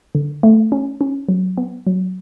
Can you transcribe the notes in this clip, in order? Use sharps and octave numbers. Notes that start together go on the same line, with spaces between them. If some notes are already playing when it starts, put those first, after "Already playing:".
D3
A3
C#4
C#4
F#3
B3
F#3